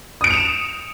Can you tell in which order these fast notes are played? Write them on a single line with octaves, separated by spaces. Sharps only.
D#6 D7 C#7 F7 E7